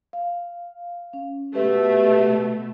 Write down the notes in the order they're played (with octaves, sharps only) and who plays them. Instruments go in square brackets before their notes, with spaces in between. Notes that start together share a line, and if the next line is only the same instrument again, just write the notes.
[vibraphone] F5
C#4
[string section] B2 A3 [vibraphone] G4 B4 E5